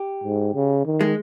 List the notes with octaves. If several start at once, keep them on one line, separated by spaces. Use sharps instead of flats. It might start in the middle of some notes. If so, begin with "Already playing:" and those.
Already playing: G4
G#2
C#3
D#3
G#3